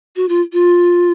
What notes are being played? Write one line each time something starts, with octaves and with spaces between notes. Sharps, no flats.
F#4
F4
F4